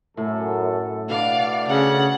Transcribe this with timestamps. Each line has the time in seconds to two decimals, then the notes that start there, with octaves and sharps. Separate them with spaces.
0.17 F#2 A2 A4
1.09 B2 A3 D4 D5 F5
1.68 C#3 F#5